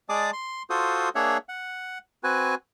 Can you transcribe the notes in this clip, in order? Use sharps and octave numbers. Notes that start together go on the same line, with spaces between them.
G#3 G#4 D5 A5 D6 D#6
C6
F4 F#4 A4 C5 D#6
A#3 D4 G#4 C#5 E5 F#5
F#5
C4 F#4 B4 G#5